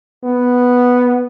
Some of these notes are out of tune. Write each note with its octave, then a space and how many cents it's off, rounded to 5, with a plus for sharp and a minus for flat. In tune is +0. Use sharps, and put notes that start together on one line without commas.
B3 +0